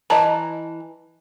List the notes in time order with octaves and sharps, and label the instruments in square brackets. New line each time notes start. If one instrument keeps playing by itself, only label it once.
[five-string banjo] E3 D#5 [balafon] A5 A#5